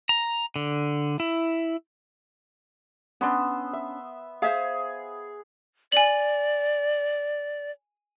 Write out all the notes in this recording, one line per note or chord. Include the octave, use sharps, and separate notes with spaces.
A#5
D3
E4
B3 C#4 D4 C6 E6
E5
G#4 C5 E5 F5
D5 G#5 F#7